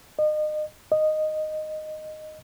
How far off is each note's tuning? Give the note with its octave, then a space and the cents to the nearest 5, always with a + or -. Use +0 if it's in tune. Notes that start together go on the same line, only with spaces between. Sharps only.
D#5 -35
D#5 -10